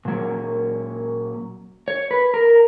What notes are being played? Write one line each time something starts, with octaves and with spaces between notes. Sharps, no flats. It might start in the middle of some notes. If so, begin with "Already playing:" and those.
A#2 F#3 A#3 C#4
C#5
B4
A#4